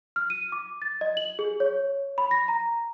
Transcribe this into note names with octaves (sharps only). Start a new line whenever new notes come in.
F6
D#7
D6
A6
D#5
F#7
G#4
C#5
B5
A#6
A#5